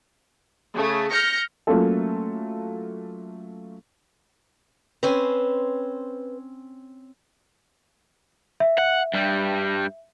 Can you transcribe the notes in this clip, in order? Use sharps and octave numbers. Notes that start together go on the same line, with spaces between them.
C#3 A3
F6 G6 A#6 C#7
F#3 A3 A#3 C#4 F4 A4
C4 C#4 B4 C5 G#5
E5
F#5
G2 G3